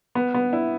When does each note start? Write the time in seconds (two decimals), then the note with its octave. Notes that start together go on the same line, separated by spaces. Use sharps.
0.15 B3
0.34 B3
0.53 E4